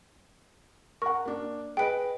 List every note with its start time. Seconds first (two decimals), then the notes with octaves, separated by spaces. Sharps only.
1.02 A#4 F#5 C#6
1.25 A#3 D4
1.77 G#4 B4 D#5 G5 D7